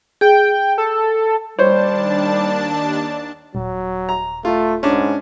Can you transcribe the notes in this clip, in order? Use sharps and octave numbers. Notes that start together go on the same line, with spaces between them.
G#4 G5
A4
D#2 G3 D4 C5 C#5 A5
D#1 F#3
A#5
A3 F4
G#2 C#4 D4